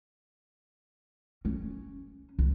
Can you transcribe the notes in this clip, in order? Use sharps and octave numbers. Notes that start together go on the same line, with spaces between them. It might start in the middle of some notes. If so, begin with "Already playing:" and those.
C#4
C#2